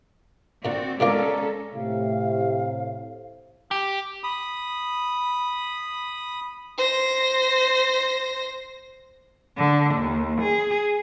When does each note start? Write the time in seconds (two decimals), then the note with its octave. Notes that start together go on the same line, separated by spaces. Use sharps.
0.65 A#2 D3 C4 F#4 D5
1.00 B2 D3 G#3 C#4 F4 A4 A#4 D5
1.74 A2 C3 F5
3.71 G4
4.24 B5 D#6
6.78 C5 A#6
9.58 D3
9.95 D#2
10.41 G#4